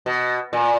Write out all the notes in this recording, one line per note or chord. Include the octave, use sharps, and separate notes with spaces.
B2
A#2